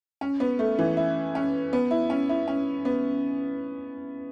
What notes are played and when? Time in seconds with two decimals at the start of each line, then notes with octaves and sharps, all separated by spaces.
0.21 C#4
0.40 B3
0.59 A3
0.79 E3
0.97 E4
1.35 C#4
1.73 B3
1.91 E4
2.10 C#4
2.29 E4
2.48 C#4
2.85 B3